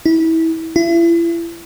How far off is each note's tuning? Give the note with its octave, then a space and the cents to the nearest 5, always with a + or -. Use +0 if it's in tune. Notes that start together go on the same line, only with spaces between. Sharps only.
E4 -25
E4 +35